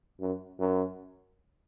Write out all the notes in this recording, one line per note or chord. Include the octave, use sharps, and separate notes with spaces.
F#2
F#2